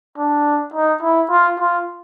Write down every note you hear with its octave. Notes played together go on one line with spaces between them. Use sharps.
D4
D#4
E4
F4
F4